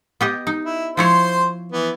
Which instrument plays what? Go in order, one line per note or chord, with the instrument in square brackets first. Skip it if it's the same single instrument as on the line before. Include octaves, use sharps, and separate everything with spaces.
[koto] B3 G4 D#5
D#4
[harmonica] E4
[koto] F3 E4 C#5 [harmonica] C5 C6
[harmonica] E3 B3